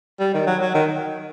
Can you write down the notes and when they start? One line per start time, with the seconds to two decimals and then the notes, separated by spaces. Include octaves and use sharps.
0.20 G3
0.34 D#3
0.47 F#3
0.62 F#3
0.74 D#3